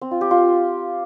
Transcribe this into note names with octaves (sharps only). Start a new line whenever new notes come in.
C4
F4
G4
F4